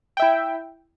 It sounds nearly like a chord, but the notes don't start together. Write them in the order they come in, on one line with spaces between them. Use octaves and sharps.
G5 E5 E4